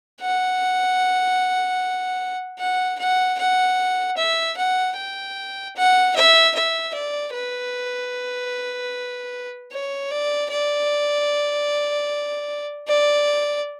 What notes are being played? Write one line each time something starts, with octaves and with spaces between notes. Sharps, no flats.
F#5
F#5
F#5
F#5
E5
F#5
G5
F#5
E5
E5
D5
B4
C#5
D5
D5
D5